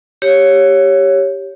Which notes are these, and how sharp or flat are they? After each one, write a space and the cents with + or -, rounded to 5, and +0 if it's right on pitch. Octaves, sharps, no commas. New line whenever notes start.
G4 +0 C#5 +0